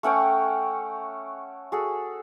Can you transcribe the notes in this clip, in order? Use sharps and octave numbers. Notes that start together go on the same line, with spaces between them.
A3 C#4 F#5 G5
F#4 G#4 A4